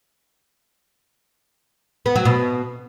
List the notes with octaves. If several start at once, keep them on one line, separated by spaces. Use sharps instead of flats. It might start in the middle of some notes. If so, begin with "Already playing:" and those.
B3
F#3
B2